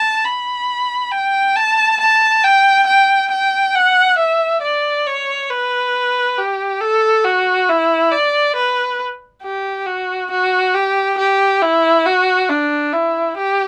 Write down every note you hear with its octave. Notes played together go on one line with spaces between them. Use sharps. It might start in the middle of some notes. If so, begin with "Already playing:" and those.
Already playing: A5
B5
G5
A5
A5
G5
G5
G5
F#5
E5
D5
C#5
B4
G4
A4
F#4
E4
D5
B4
G4
F#4
F#4
G4
G4
E4
F#4
D4
E4
G4